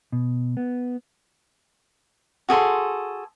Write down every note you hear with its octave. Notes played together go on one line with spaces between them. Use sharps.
B2
B3
F#4 G#4 A4 C6